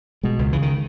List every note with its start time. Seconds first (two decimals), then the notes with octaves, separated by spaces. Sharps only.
0.23 B2 G#3
0.39 C#2
0.53 C#3 E3
0.62 D#3